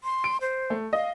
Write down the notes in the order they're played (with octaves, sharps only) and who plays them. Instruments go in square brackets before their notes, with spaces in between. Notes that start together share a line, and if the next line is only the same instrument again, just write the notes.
[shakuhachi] C6
[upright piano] D7
[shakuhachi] C5
[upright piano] A3
[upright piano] D#5 [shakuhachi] F5